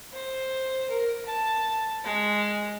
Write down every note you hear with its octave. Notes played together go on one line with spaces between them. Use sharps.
C5
A#4
A5
G#3